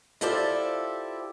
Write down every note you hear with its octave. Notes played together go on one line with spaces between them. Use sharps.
E4 F4 G4 A4 C5 D5